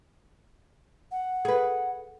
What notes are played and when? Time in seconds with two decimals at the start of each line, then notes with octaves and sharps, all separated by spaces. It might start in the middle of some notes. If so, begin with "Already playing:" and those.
1.11 F#5
1.45 G#4 B4